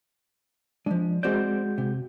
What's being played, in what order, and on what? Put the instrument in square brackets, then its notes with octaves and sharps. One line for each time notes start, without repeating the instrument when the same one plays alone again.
[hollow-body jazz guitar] F3 G#3 [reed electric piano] D4
[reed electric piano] G#3 F#4 G6 [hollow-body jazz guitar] C4 C5 D5
[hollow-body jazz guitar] C3